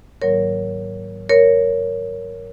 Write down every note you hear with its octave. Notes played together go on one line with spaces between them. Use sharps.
G#2 D#3 F#3 A#3 A#4 C#5
A#4 C#5